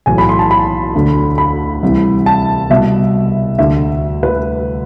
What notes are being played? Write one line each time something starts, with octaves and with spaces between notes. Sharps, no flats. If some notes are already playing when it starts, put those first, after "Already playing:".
B1 A2 E3 G#5
B5
C6
A5
B5
D2 D3
B5
C2 C3 E3
A5
C2 B2 E5
D2 D3 E5
B4